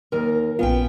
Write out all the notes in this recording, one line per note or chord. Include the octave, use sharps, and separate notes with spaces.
D#2 A#4
A#1 B3 C#4 F4 G5